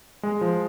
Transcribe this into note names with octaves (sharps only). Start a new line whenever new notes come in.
G#3
F3